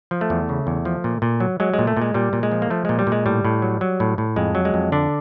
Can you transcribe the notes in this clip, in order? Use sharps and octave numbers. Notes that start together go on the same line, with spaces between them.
F3
A3
E2
C#3
E2
F3
A#2
A#2
F#3
F#3 G#3
G#3
A#2
A3
A#2 G#3
A#2 G3
A#2
G#3
F3
A#3
F3 A3
A#2 G#3
G3
A#2
G#3
A2 G3
A2
F#3
F#3
A2
A2
F2 G#3
F#3
G#3
F2
D3 D4